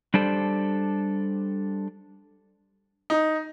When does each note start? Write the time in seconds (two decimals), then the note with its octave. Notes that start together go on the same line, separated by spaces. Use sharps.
0.14 G3 D4 G4 A4 C5 D5
3.10 D#4